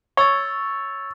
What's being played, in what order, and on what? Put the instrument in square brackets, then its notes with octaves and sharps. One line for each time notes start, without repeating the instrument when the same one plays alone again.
[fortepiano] C#5 [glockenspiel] C#6 E6 A6